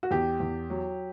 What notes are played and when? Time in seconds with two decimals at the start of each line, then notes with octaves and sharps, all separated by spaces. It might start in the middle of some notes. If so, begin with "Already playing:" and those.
0.03 F#4
0.11 E2 G4
0.40 E2
0.70 F#3